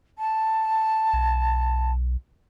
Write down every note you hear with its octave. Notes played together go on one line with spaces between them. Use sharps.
A5
B1